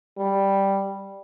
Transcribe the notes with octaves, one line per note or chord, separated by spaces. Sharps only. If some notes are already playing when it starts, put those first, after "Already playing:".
G3